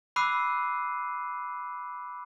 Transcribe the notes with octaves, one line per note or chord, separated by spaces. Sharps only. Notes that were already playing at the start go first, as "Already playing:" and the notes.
B5 D6 E6 F#6 C7 D#7